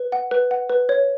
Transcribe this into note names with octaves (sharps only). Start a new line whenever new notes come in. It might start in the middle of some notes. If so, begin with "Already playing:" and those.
Already playing: B4
F#5
B4
F#5
B4
C#5